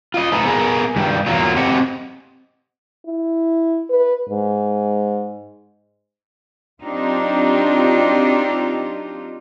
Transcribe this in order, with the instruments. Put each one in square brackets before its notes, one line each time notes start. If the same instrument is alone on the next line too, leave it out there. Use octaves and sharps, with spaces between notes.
[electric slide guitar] F4 D#5
A3 D#4 E4 A4 B4
B3 G#4 A#4
G2 D#3 G3
E2 F#3 A#3 F4
C4 G4 D#5 F#5
[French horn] E4
B4
G#2
[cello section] F#3 C4 D4 D#4 F4 G4